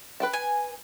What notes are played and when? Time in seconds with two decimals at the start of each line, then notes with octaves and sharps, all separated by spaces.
0.20 B4 G5 A5
0.33 G#5